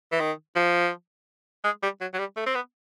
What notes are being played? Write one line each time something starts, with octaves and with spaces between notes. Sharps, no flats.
E3
D#3
F3
G#3
G3
F#3
F#3
G3
A3
C4
B3